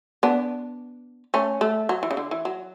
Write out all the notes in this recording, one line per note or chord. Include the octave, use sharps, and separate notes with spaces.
B3 D4
A3 C#4
A3
F#3
E3
C#3
D3
E3
F#3